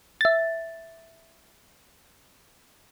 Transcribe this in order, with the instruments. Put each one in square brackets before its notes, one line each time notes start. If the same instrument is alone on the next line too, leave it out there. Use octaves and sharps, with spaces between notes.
[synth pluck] E5 A6